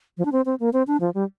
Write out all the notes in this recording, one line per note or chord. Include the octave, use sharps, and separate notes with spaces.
F3
D4
C4
C4
A#3
C4
D4
F3
G3